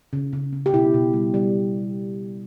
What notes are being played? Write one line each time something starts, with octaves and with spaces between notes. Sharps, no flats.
C#3
C#3
C#3
G4
B2 E4
B2
G3
G3